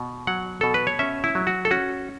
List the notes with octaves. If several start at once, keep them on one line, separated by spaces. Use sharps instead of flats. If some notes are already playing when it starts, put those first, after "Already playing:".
Already playing: B2
F#3 F#5
B2 A4
B4
C#5
C#4 E5
E4
F#3
F#4
A4
C#4 F#4